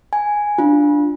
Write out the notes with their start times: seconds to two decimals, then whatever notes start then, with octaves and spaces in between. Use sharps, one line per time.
0.13 G#5
0.58 D4 F4